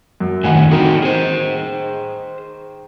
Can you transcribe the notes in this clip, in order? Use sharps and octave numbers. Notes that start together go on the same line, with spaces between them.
F#2
A2 D3 D#3 F#5 G#5
D#3 E3 A#3 C4 F#4
G#4 C5